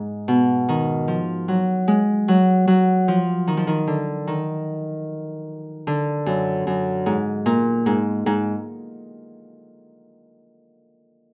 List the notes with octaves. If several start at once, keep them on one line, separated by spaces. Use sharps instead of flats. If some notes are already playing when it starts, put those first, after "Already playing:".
Already playing: G#2
B2
D#3
F3
F#3
G#3
F#3
F#3
F3
D#3
F3
D#3
D3
D#3
D3
F#2
F#2
G#2
A#2
G#2
G#2